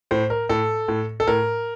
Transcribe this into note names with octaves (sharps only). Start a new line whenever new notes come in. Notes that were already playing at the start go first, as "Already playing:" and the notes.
A2 C5
A#4
A2 A4
A2
A4
A2 A#4